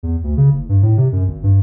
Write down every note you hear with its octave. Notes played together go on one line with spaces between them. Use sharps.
E2
D2
C#3
F#1
G2
A2
C3
F#2
G#1
G2